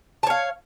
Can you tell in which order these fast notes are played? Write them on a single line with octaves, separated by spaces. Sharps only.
A5 C#5 F5